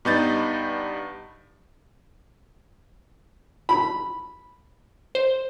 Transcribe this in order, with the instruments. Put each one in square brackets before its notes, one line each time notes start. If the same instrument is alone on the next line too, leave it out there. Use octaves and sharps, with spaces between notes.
[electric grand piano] G2 G3 B3 D#4 G6 A6
[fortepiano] B5
[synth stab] C5